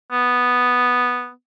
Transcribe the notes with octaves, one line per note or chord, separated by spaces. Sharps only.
B3